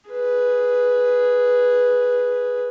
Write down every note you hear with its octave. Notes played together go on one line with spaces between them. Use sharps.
G#4 B4